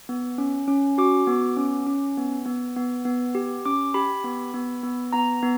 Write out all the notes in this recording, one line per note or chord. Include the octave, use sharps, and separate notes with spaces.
B3
C#4
C#4
F#4 D6
B3
C#4
C#4
B3
B3
B3
B3
G4
C#4 D6
G4 B5
B3
B3
B3
B3 A#5
B3